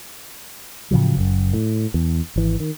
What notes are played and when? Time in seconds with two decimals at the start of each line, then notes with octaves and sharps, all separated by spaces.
0.91 A2 C#3 F3 F#3
1.17 F#1 F#2
1.53 A2
1.94 E2
2.36 G#1 E3
2.60 D#3